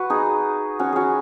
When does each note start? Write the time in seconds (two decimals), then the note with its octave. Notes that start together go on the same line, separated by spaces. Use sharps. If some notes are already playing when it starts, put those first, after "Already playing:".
Already playing: F#4 B4
0.10 D#4 G#4
0.79 C#4 F#4
0.92 C#4 F#4 G#4